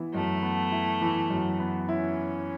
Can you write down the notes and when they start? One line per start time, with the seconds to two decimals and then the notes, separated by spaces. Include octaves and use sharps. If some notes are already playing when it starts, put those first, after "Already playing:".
Already playing: E3 B3 E4
0.14 F#2 A3
0.42 B3
0.72 E4
1.02 E3
1.30 F#2
1.59 B3
1.89 C#4 E4